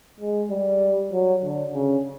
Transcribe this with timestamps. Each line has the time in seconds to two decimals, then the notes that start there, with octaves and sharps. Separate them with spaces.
0.20 G#3
0.51 G3
1.13 F#3
1.44 D3
1.74 C#3